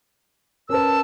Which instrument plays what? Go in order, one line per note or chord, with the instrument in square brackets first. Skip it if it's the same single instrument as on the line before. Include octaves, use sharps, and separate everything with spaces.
[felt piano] C#4 B4 [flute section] A#4 A5 E6